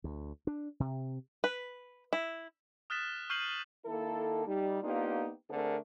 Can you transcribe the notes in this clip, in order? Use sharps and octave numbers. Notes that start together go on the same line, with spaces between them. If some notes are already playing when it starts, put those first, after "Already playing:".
D2
D4
C3
B4
E4
D#6 F6 F#6 A6 B6 E7
C#6 F6 G6 C7 D#7 F#7
D#3 A#3 E4 A4
G3 D#4
A#3 B3 D4 D#4 F4 G4
D3 A3 C4 D4 G#4 A#4